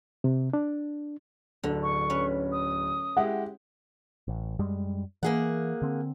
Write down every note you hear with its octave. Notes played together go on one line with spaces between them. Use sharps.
C3
D4
D1 D3
C#6
C#4 B4
D#6
G#3 E4 G4 F#5
A1
F#2 G3 G#3
E3 A#3 G#4 F#5
D3 C4